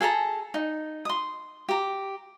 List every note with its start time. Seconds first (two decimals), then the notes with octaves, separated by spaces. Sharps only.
0.01 G#4 A4 A5 A#5
0.54 D#4
1.05 C6 D#6
1.69 G4 A#5